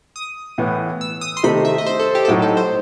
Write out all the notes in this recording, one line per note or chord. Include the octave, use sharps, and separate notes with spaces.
D#6
A2 E3 B3
E6
D#6
C6
C3 D#3 A3 D#4 B5
E5
D#5
C5
A4
G4
A4
A2 F#3 A3 D#4 G4
A4
C5